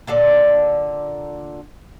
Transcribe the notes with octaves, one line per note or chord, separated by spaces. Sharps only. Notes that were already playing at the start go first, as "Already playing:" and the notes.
A#2 D3 A4 D5